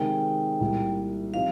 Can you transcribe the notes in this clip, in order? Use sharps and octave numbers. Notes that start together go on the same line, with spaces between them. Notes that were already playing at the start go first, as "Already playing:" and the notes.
Already playing: C3 D#3 G#3 D#4 A#4 G5
C2 A#2 G3
F3 C4 D#4 G4 F5